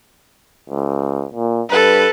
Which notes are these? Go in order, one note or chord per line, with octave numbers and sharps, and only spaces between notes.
C#2
A#2
G2 A4 B4